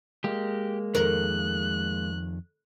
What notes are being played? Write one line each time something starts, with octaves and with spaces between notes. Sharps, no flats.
G#3 A#3 G4
F2 D#3 A#4 F#6